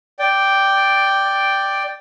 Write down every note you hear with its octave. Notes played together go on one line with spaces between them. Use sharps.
D5 G5